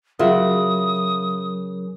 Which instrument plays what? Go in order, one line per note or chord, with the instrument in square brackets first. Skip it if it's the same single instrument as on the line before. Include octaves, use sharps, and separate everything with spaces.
[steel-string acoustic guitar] C#3 [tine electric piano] F#3 A#4 [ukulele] F4 F#4 E5 [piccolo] D#6